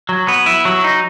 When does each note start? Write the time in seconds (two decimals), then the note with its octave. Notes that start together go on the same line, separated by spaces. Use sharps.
0.09 F#3
0.28 B3
0.46 E4
0.65 F#3
0.84 D#4